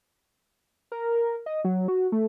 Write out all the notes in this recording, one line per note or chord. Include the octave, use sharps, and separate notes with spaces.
A#4
D#5
F#3
F#4
A3